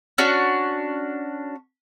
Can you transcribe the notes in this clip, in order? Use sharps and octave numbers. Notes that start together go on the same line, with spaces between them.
C#4 D4 F#4